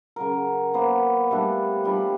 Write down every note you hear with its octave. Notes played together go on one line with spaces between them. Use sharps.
C#3 F#3 A#4
A#3 B3 C5
G3 A3 D4
F3 G3 D4